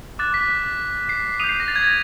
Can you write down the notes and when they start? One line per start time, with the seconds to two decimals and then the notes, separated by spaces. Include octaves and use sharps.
0.19 D6 F#6 A6
0.34 B6
1.09 C7
1.40 D#6 G6 D#7 F7
1.49 C7
1.60 A#6
1.68 A6
1.76 G#6
1.83 A6